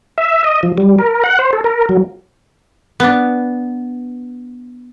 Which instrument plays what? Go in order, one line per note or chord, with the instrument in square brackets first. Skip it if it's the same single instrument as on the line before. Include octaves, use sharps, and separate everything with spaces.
[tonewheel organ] E5
D#5
F3
G3
A#4
F#5
C5
A4
A#4
F#3
[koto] B3 D4